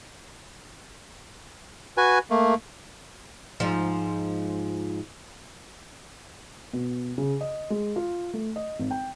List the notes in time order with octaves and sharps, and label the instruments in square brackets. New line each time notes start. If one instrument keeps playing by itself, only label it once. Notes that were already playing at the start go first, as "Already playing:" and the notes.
[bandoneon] F#4 B4 G#5
A3 A#3
[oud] G#2 F3
[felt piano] B2
C#3
D#5
G#3
F4
A3
D#5
G#1
G5